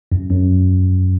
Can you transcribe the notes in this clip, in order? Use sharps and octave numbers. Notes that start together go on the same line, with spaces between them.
F#2
F#2